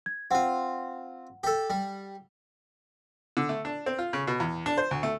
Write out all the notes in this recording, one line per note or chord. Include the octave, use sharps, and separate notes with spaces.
G#6
C4 F4 F#5
G4 A4
G3
D3
A3
D4
C4
F4
C#3
B2
E2
D4
C5
D2
A3